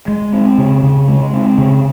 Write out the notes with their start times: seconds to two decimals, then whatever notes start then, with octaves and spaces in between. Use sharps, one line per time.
0.08 G#3
0.33 C4
0.58 C#3
0.83 C#3
1.08 G#3
1.33 C4
1.58 C#3